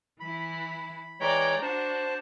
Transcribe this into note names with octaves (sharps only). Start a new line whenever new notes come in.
E3 E4 B5
E3 G#3 C#5 D5 G5 A#5
D4 F#4 C5 A5